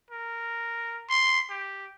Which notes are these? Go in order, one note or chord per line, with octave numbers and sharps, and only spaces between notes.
A#4
C6
G4